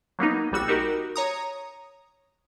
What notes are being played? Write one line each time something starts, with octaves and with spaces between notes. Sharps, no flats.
F#3 A#3 B3 D#4
A#1 G3 F#4 E6
D#4 F#4 G4 A#4
C#5 A#5 D#6